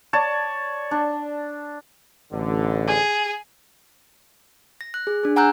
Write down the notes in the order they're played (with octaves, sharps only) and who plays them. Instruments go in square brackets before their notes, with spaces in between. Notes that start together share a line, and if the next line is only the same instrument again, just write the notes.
[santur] C#5 D5 A5
D4
[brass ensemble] A1 D3
[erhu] G#4
[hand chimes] A#6
F#6
G#4
D4 G#4
F#5 G#5 A#5 E6 F#6 G6